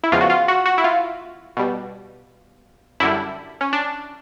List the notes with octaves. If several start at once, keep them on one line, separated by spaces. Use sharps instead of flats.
E4
E2 C#3 F3 G#3 F4
F#4
F4
F#4
F#4
E4
F4
B2 G3
F#2 D3 G3 E4
C#4
D4